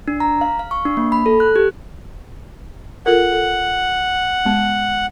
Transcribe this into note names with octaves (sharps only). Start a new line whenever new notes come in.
D4
A#5
F5
F5
C#6
D4
A#3
B5
A4
F#6
G4
F4 A4 A#4 F#5
A4
G#3 B3